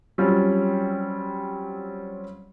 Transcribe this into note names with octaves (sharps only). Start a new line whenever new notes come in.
F#3 G3 C4 C#4 F4